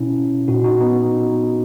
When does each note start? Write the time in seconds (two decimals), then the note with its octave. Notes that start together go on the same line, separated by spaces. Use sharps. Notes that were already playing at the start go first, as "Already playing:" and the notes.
Already playing: B2 C#4 E4
0.48 A#2 D#4 F#4
0.64 D#4 F#4
0.81 B3 D#4